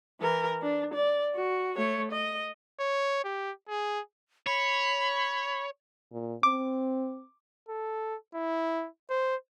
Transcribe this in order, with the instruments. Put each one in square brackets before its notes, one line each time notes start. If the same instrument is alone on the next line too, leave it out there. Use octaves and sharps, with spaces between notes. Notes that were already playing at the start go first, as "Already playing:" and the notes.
[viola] E3 A#4
D4
D5
F#4
A3 C#5
D#5
[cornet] C#5
G4
G#4
[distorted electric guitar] C#5 [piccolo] B5
[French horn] A#2
[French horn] C4 [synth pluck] D6
[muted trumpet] A4
E4
C5